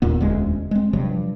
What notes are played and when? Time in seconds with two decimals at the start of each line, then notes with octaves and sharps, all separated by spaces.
0.02 E1 D#2 A#2 B3
0.21 E1 D2 G#3 C#4
0.71 G#3 C4
0.93 G2 C3 F3 F#3